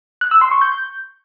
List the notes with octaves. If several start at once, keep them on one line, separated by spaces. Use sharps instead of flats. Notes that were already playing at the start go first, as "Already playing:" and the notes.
F#6
E6
C6
C#6
G6